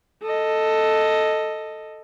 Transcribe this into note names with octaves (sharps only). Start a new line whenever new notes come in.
A4 D#5